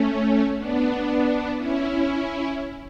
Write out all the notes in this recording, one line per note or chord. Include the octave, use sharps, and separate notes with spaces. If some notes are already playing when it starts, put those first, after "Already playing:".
Already playing: A3 C#4
B3 D4
C#4 E4